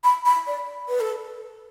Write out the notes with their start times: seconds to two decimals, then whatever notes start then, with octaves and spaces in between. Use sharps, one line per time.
0.04 B5
0.25 B5
0.47 D5
0.89 B4
1.00 A4